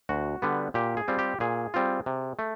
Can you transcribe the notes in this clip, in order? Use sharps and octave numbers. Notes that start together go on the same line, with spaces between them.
D2 F#4
D3 G3 B3
A#2 G4
G#4
G3 C4 F4
G4
A#2 G#4
G3 C4 F4
C3
A3